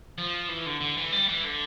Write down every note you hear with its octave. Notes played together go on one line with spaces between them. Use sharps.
F3
E3
D3
D3
E3
G3
E3
D3